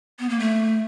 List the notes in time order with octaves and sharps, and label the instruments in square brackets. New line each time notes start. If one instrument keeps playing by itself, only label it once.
[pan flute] B3
A#3
A3